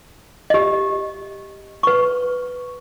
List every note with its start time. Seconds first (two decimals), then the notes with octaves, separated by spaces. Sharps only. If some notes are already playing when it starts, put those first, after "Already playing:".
0.50 G4 D#5
1.83 B4 C#6